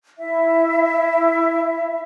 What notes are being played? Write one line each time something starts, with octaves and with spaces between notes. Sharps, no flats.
E4 E5